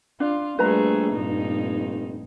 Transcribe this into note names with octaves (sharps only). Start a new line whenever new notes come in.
D4 F4
A#1 G3 A3 G#4 B4 A#5
F1 G2 A#2 D#4